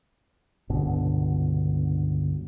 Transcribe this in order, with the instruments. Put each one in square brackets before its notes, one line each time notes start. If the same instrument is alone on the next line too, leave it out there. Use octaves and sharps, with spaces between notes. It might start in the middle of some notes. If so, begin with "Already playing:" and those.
[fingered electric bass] G1 C#2 B2 D3